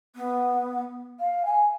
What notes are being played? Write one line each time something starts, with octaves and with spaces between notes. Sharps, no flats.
B3
F5
G#5